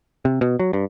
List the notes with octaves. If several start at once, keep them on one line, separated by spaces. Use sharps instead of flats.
C3
B2
F#3
G2